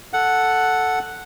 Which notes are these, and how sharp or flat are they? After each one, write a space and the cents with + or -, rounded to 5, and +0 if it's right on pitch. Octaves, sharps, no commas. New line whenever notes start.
A4 +0 F#5 +0